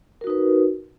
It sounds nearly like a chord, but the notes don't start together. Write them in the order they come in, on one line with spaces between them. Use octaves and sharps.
A#4 F#4 D#4 B4